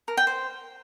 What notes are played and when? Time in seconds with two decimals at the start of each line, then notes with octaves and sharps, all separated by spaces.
0.08 A#4
0.17 G5
0.27 C5